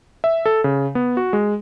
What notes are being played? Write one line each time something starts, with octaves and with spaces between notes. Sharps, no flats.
E5
A4
C#3
B3
F#4
G#3